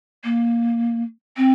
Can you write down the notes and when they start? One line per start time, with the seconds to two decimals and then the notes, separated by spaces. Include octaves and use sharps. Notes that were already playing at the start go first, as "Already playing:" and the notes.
0.24 A#3
1.37 C4